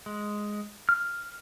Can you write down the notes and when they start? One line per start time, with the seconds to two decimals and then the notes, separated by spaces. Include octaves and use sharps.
0.06 G#3
0.89 F6